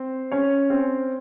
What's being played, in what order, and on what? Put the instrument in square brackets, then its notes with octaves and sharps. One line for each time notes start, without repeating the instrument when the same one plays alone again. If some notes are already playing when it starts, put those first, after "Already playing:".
Already playing: [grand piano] C4 C5
C#4 C#5
C4 C5